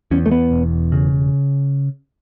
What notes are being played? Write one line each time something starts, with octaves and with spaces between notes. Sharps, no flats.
E2 C#4
A3
B3
E1
C#3